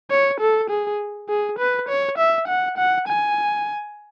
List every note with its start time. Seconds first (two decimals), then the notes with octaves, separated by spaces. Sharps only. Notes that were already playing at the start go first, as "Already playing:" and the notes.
0.11 C#5
0.40 A4
0.70 G#4
1.29 G#4
1.59 B4
1.89 C#5
2.18 E5
2.48 F#5
2.77 F#5
3.07 G#5